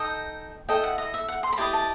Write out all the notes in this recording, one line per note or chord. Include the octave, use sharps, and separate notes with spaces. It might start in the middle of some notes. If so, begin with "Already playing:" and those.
Already playing: D#4 A4 D#5 G5
E4 A4 D#5 G5
F#5
D#5
E5
F#5
C6
B5
E4 G4 B4 D#5 A5
A5